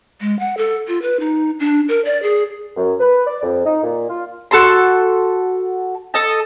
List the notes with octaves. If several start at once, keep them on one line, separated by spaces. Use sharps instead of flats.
G#3
F#5
A4
F4
B4
D#4
D4
A#4
D5
G#4
F#2
B4
D5
F2
D#4
A#2
F4
F#4 A4 A5 C6
A4 D#5 A5